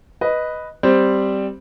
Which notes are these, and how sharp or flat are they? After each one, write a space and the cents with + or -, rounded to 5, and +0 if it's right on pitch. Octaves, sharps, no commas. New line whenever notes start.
B4 +0 D#5 +0
G3 +0 C4 +0